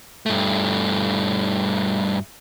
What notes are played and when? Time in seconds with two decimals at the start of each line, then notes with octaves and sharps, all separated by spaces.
0.26 G2 A3